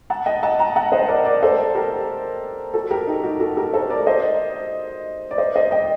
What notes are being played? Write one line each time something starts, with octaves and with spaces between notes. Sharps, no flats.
F#5 A5
D#5 G5
F#5 A5
G5 A#5
F#5 A5
C5 D#5
A#4 D5
A#4 D5
A4 C5
G4 A#4
F#4 A4
G4 A#4
D#4
F#4
F#4 A4
G4 A#4
A4 C5
A#4 D5
C5 D#5
D5
C5 D#5
C5 D#5
D#5 G5